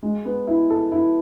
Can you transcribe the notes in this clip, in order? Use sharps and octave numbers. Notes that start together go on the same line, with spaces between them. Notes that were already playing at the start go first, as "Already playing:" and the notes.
G#3
B3
E4
A4
E4